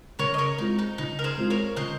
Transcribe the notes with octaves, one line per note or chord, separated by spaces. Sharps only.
C#3 A#4 C#5
D#5
A#4 C#5
G#3 C4 D#4 F4
D#4
C#3 D#4
A#4
G#4 C5
G#3 C4 F4
A#4 C#5
C#3 C5 D#5